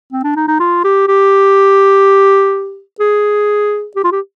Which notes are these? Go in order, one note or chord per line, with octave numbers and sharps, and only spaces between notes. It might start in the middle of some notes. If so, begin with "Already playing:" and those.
C4
D4
D#4
D#4
F4
G4
G4
G#4
G4
F4
G4